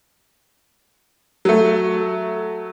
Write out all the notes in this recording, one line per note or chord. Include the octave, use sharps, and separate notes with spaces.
F#3 A3